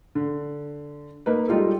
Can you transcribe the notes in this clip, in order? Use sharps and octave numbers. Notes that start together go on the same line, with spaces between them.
D3
A#3 D#4 B4
G3 G#3 D#4 F4 G4 A4